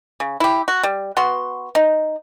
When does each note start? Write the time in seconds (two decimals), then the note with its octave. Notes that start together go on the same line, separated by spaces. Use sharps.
0.20 C#3
0.40 E4 G4
0.68 F#4
0.83 G3
1.17 B3 F#4 C6
1.75 D#4